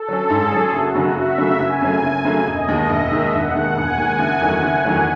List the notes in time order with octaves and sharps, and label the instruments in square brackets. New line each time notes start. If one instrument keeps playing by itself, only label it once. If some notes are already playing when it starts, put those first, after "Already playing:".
Already playing: [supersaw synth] A4
[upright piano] F#3 C#4
[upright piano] G#2 [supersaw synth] G#4
[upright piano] F#3 C#4
[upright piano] F#1 [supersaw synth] F#4
[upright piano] F#2 C#3 F#3 A3
[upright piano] F#1 [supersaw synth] E5
[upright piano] F#2 C#3 F#3 A3
[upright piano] F#1 [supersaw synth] G#5
[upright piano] F#2 C#3 F#3 A3
F#1
F#2 C#3 F#3 A3
[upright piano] E1 [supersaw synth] D#5
[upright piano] D#2 D#3 G#3
[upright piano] E1 [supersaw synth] E5
[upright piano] D#2 D#3 G#3
[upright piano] E1 [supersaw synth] F#5
[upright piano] D#2 D#3 G#3
[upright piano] E1 [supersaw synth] G#5
[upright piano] D#2 D#3 G#3
F#1
E2 D#3 F#3 A3
F#1
E2 D#3 F#3 A3